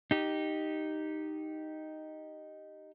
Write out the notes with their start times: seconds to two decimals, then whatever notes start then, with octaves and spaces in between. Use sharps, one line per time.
0.11 D#4 G4